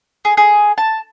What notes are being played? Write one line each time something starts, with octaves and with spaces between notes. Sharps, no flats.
G#4
G#4
A5